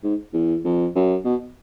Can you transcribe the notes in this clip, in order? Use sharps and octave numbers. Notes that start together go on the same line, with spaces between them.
G#2
E2
F2
F#2
B2